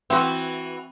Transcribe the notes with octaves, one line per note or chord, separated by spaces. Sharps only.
E3 C4 F#4